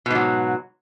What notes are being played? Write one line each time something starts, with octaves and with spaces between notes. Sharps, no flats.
G#2 B2 F#3